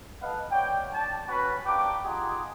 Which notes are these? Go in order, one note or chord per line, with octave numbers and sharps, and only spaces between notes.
A4 B4 D#5 F5 F#5
C#5 D5 F#5 G5
D4 A5
C#4 F#4 B4
A#3 D4 G4 G5 D6
D#4 F4 G4 G#4 D#5 F#5